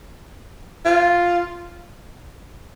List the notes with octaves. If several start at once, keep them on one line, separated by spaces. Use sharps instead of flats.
F4